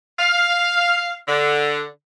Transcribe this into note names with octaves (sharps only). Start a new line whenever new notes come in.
F5
D3